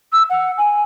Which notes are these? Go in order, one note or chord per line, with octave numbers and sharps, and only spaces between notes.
E6
F#5
G#5